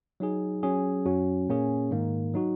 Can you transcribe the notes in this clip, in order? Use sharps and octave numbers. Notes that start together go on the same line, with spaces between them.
F#3 D#4 G#4
F#3 C#4 G#4
F#2 F#3 C#4 F#4
A#2 A#3 C#4 G#4
G#2 D#3 A#3
F#3 D#4 F#4